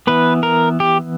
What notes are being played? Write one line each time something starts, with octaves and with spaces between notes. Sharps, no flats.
E3 B3 B4
A#4
G4